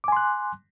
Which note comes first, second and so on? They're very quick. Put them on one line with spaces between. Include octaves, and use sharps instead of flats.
D6 G#5 C6 F#6